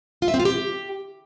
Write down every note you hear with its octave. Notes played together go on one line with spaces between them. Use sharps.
F4
E5
C4
F4
G4